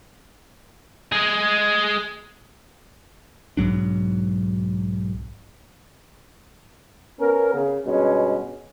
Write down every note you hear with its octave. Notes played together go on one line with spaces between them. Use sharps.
G#3 G#4
B1 G#2 F#3 D4
B3 C#4 A#4
C#3
G2 B2 G#3 C#4